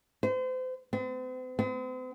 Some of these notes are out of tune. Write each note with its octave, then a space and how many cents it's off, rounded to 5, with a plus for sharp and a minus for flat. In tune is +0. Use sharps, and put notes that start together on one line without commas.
C5 -35
C4 -45
C4 -45